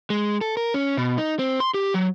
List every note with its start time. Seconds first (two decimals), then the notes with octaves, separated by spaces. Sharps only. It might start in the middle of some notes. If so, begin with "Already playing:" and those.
0.10 G#3
0.41 A4
0.57 A#4
0.74 C#4
0.97 B2
1.18 D#4
1.39 C4
1.60 C6
1.74 G4
1.94 F#3